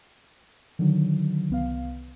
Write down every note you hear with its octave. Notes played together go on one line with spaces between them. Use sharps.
D3 D#3 F#3
C2 B3 F5